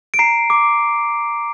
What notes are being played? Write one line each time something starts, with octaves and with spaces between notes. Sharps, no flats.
D7
A#5 C7
D6